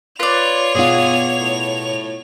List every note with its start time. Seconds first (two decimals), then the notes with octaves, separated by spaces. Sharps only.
0.20 F4 B4 C#5 D5 F7
0.75 B2 B3 F4 G#4
1.39 A2